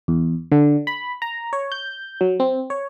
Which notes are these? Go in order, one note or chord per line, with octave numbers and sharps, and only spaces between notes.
E2
D3
B5
A#5
C#5
G6
F#3
C4
C#5